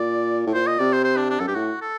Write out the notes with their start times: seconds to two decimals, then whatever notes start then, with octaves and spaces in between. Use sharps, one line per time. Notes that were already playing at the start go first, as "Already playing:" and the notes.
Already playing: A#2 D5
0.47 A2
0.54 A#2 C5
0.67 D#5
0.79 C3 D5
0.92 C5
1.04 C5
1.17 D4
1.30 D4
1.40 F#2 A4
1.47 G2 G4
1.55 A2 F#4
1.81 A4